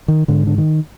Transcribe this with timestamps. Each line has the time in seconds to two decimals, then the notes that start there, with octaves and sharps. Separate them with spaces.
0.08 D#3
0.28 G#2 D3
0.47 D3
0.58 D#3